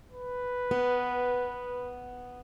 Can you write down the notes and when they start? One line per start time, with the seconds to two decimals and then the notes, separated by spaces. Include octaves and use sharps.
0.12 B4
0.71 B3